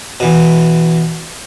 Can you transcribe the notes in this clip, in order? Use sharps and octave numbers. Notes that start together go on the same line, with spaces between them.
B2 E3